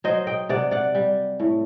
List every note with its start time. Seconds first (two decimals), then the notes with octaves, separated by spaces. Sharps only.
0.04 F#3 C5 D#5
0.27 D#5 G5
0.49 C3 D5 F#5
0.71 D5 F#5
0.95 G3
1.40 A2